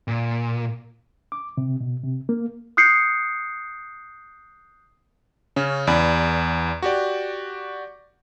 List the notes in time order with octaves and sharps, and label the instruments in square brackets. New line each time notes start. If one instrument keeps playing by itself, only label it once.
[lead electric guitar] A#2
[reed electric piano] D6
C3
B2
C3
A#3
[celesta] D#6 F#6 G6 C7 C#7
[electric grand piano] C#3 C#4
E2 D5 B5
F#4 G4 D5